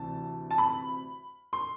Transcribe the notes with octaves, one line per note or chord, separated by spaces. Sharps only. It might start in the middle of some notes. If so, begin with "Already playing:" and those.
Already playing: D2 C3 E3 A5
A5
B5
C6